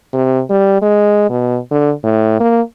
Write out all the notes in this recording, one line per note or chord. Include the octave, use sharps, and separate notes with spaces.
C3
G3
G#3
B2
D3
A2
A#3